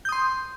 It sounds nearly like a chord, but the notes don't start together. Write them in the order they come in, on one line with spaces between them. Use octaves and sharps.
G6 D#6 C6